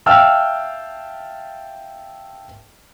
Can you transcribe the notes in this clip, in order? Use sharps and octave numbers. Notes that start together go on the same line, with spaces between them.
E5 F5 G5 A5 E6 F6